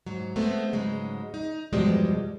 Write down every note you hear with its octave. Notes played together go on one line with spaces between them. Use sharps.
G#2 F#3
G#3 A3 B3 C4
G#2 C#3 F#3 G#3
D#4
E2 G2 B2 F3 G3 G#3